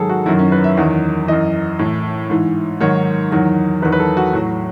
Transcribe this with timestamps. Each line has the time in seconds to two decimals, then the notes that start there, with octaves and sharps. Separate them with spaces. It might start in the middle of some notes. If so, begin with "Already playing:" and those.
Already playing: G#2 D#3 F#3 G#4 A4
0.09 F#4
0.26 F#2 D#3 F#3 E4
0.39 C#4
0.52 B4
0.64 E5
0.77 E2 D#3 F#3
1.28 F#2 E3 D#5
1.79 A2 E3
2.30 G#2 E3
2.80 G#2 D#3 F#3 C#5
3.32 E2 D#3 F#3
3.82 E2 D#3 F#3 B4
3.92 B4
3.99 A4
4.17 F#4
4.33 A2 F#3